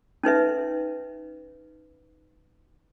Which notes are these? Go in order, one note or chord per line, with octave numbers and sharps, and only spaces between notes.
C#4 D#4 B4 E5